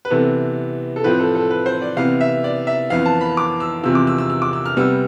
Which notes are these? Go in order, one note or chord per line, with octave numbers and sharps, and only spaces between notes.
B4
C3 E3 B3 A4
A4
A2 F3 C4 B4
A4
A4
B4
C5
D5
C3 E3 B3 F5
E5
D5
E5
F2 E3 B3 F5
A5
B5
D6
E6
E2 C3 F3 E6
D6
E6
E6
E6
D6
E6
F6
C3 G3 B3 E6